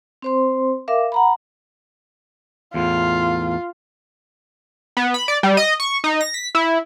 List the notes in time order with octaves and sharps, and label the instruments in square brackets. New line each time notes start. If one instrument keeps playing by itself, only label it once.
[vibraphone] C4 C5 C6
A#4 E5 F5 D6
F#5 A#5 B5
[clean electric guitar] E2 A2 [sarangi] F4
[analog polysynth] B3
B5
D5
G3
D#5
C#6
D#4
A#6
B6
E4